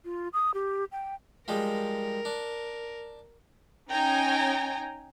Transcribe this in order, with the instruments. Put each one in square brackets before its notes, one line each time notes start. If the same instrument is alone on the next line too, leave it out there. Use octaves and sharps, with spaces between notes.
[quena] F4
D#6
G4
G5
[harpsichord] F3 G3 G#3 [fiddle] A#4
[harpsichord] D4
[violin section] C#4 D#4 G5 G#5 A#5